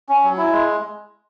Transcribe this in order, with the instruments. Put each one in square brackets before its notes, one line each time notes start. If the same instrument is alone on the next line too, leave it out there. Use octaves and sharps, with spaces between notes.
[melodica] C#4
F#3
E4
G#3